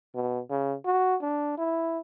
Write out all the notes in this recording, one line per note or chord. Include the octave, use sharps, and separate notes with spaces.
B2
C#3
F#4
D4
E4